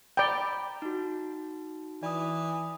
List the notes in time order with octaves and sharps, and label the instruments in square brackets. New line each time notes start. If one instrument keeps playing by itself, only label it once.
[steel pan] D5 G5 [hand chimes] A#5 B5
[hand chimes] D#4 F#4
[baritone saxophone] E3 [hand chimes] D5 D#6